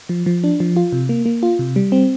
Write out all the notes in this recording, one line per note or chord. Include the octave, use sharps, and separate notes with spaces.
F3
F3
D4
F3
F4
C3
A#3
A#3
F4
C3
G3
C4